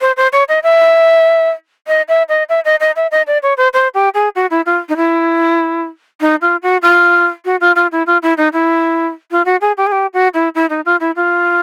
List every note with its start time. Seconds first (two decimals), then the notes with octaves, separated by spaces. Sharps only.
0.01 C5
0.17 C5
0.33 C#5
0.49 D#5
0.63 E5
1.87 D#5
2.08 E5
2.29 D#5
2.49 E5
2.65 D#5
2.80 D#5
2.96 E5
3.11 D#5
3.27 D5
3.43 C#5
3.57 C5
3.74 C5
3.94 G4
4.14 G#4
4.36 F#4
4.50 E4
4.66 F4
4.89 D#4
4.97 E4
6.21 D#4
6.42 F4
6.63 F#4
6.82 F4
7.45 F#4
7.61 F4
7.76 F4
7.92 E4
8.07 F4
8.23 E4
8.37 D#4
8.53 E4
9.31 F4
9.45 F#4
9.61 G#4
9.77 G4
9.87 G#4
9.92 G4
10.14 F#4
10.34 E4
10.55 E4
10.70 D#4
10.86 F4
11.00 E4
11.16 F4